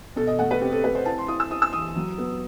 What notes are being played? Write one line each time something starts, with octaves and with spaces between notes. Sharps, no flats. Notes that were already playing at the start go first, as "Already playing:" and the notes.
B2 A4
D#5
A3 F#5
B4
C4 G4
A4
A3 B4
C5
E4 A5
C6
E4 D#6
E6
E4 D#6
E6
E3 D#6
F#3
B3